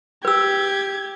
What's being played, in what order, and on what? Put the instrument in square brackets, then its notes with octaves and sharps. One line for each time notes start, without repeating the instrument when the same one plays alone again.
[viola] G4 [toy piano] B4 E6 [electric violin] G#6